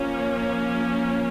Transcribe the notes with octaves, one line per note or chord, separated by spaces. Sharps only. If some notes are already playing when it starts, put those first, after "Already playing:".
Already playing: F3 A#3 C#4